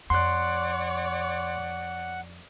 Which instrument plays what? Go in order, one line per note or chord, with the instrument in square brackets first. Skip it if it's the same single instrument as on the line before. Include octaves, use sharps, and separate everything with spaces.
[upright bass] F2 [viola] C#5 D5 [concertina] F#5 [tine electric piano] C6 F#6